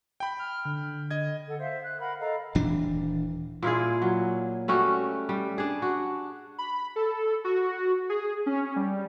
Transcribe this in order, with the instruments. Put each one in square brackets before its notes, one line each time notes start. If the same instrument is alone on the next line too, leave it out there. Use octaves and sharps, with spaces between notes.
[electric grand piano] G5 B5
[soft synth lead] F6
D3
[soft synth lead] D3 [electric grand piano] D#5 G#6
[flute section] A4 F#5
C5 E5 F5
F#6
A#4 F5 F#5 B5
A4 D#5 F5 A#5
[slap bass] D#1 E3 D4
[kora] A#2 E4 F4 G#4
F#3
G3 A3 C#4 F#4
G3
D4 G#4
F#4
[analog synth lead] B5
A4
F#4
G#4
C#4
G3